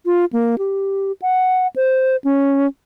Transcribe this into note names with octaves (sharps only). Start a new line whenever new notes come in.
F4
A#3
G4
F#5
C5
C#4